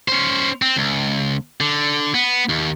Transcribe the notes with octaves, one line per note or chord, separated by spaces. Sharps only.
C#4 C5
C4
C#2
D3
B3
D#2